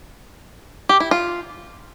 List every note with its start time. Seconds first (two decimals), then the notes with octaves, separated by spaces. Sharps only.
0.89 G4
1.00 E4
1.11 F4